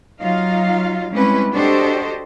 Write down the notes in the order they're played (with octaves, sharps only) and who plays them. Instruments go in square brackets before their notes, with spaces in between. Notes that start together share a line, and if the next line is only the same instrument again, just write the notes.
[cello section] F#3 D#4 F4 F5
G3 G#3 C4 C#4 E4 B4
D4 F#4 G4 A4 C5 D#5